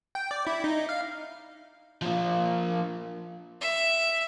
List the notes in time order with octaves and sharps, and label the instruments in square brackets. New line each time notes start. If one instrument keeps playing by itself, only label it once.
[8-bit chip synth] G5
D5
E4
D#4
F5
[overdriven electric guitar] F3 A#3
[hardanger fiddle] E5